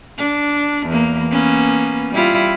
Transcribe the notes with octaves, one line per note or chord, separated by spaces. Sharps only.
D4
E2 A#3
A#3 B3 C#4
G3 E4 F4